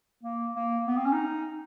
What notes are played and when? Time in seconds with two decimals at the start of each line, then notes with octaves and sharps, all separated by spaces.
0.23 A#3
0.55 A#3
0.87 B3
0.96 C4
1.05 C#4
1.13 D#4